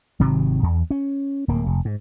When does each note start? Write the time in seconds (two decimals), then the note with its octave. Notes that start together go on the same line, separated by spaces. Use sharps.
0.20 G#1 C3 D#3 F#3
0.63 E2
0.91 C#4
1.48 D1 A#3
1.66 F1
1.85 G#2